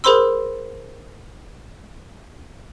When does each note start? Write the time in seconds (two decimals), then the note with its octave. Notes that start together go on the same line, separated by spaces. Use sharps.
0.04 G#4 A#4 C5 B5 C6 E6